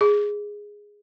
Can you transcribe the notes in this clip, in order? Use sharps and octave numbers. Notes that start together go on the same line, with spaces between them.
G#4